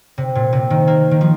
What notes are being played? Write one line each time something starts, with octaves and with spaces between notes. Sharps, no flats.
C3
A#2
C3
D#3
A#3
D#3
F3